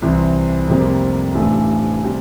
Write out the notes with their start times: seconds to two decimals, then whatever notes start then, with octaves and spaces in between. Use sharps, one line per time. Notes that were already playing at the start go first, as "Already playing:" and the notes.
0.02 C2 C3 E3
0.68 F1 F2 C3 G3 A#3
1.35 A1 G2 E3 A3
2.04 C3 G3